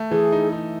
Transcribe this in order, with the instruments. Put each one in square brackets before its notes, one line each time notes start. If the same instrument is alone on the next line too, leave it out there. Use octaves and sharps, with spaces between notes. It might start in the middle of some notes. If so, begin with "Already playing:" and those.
Already playing: [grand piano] A3
[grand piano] E3 [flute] G#4
[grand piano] D#4
D#4